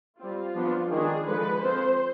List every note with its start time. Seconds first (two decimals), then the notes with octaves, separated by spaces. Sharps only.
0.20 G3 C4 F4
0.55 F3 B3 D4
0.91 D#3 G#3 D4 G#4
1.27 D3 F3 G#3 B4
1.63 F3 C4 C5